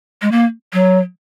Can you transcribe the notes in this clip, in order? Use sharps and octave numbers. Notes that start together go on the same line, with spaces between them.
G#3
A#3
F#3